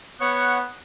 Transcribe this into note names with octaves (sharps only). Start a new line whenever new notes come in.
B3 C#5 F#5 C#6